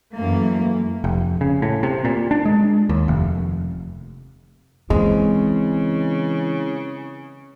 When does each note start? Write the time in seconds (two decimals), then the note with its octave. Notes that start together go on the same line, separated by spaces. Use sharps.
0.14 F#2 E3 A3 A#3
1.04 F1
1.41 C#3
1.62 A2
1.83 C3
2.05 A#2
2.31 D4
2.46 G#3
2.89 D#2
3.08 F1
4.90 C#3 E3 G#3 C4